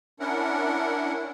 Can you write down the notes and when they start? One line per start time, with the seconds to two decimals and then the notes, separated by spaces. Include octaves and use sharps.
0.20 C#4 D4 E4 A#4 F#5